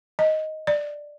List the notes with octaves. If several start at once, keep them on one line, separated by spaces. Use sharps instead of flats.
D#5
D5